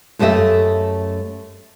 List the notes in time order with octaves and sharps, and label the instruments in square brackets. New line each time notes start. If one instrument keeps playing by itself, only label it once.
[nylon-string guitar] F#2 A3 G4 D#5 E5